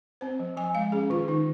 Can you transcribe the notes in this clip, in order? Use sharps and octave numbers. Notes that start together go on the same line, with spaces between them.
C4 C5
F3
F3 G#5
G#3 F5
C#4 G#4
D#3 F4
D#3 D#4